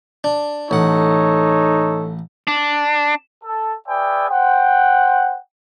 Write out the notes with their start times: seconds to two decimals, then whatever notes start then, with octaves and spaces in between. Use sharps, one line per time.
0.24 D4
0.71 A1 D#4 A4 C#5 F#5
2.47 D4
3.44 A4
3.89 G#4 B4 D5 E5 G5 G#5
4.30 C5 F#5 G5